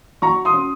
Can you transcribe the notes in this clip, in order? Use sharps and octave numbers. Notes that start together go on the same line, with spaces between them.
F#3 A#5 C#6
C6 D#6
C#4